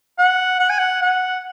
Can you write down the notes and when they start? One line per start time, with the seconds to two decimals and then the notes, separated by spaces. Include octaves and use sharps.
0.18 F#5
0.59 F#5
0.69 G#5
0.79 F#5
1.02 F#5